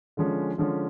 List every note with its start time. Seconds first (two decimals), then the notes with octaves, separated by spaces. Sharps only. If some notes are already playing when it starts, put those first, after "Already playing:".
0.17 D3 F3 G#3 C#4
0.58 D3 F3 G#3 C#4